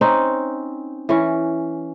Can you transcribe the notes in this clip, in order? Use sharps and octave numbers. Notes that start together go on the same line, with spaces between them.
C4 C#4 D#4
E3 C#4